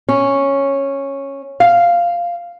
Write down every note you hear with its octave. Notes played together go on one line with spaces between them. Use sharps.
C#4
F5